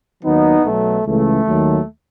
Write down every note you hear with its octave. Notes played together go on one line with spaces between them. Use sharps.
D#2 D#3 F#3 B3 D#4
B1 B2 F#3 A3
C#2 C#3 E3 A3
D#2 D#3 F#3